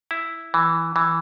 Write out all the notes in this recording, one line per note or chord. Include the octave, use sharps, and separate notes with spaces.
E4
E3
E3